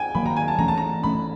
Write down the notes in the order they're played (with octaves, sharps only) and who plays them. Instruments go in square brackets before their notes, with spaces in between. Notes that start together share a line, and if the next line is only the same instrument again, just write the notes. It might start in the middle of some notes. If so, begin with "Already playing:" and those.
Already playing: [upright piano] G5 G#5
[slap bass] D#3 F#3 A#3 [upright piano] B5
[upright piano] A#5
G#5
A5
[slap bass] E3 A3 C#4 [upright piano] A#5
[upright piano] A5
A#5
[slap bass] E3 A3 C#4 [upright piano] B5